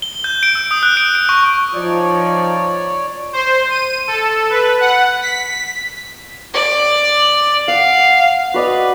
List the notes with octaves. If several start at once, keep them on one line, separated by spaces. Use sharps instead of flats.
G7
G6
D7
E6
D#6
F#6
D7
D7
C#6
F3 D#4 C#5 D5
C5
D#7
A4
B4
F#5
B6
D5
F5 F#5
F#4 B4 D5 D#5